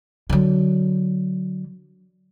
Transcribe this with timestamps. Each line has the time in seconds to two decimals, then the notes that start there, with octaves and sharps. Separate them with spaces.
0.30 D3 F#3